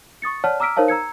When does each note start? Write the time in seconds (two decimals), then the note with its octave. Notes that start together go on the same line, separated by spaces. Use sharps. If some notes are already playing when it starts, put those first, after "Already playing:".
0.22 C#6 D#6 A6 C#7
0.44 C#5 D5 F#5 A5 F6
0.60 A#5 D6 E6 F6 B6 D7
0.76 D#4 A#4 C5 C#5 F5 A5
0.88 A#5 E6 G#6 C#7